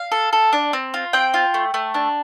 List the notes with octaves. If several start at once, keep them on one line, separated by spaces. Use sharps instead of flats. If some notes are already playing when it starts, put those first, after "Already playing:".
Already playing: F5
A4
A4
D4
C4
F4
C4 G5
F4
A3
A3
D4